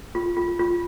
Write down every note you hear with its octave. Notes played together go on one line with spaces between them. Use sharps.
F4
F4
F4